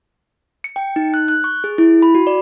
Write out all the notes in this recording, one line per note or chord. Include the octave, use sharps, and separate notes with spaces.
C#7
G5
D#4
F#6
F#6
C#6
G#4
E4
B5
F#4
D5